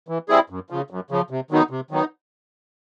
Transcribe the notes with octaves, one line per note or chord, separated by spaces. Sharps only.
E3
G3 C4 E4 G#4
F#2
C#3 F3
F#2
C#3 F3
C3
D#3 F#3 B3 D#4
C3
D#3 F#3 B3 D#4